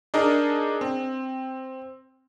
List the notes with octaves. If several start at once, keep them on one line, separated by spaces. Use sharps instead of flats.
D4 D#4 G#4 A#4 D5 D#5
C4